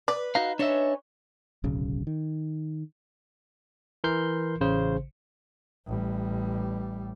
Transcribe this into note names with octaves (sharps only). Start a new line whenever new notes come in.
B4 D5
D#4 F#4 D#5 F5
C#4 D4 B4 C#5 D#5 E5
D1 B1 C#3
D#3
E3 A#4 C6 G6 C7
A1 C#3 C5
A1 G3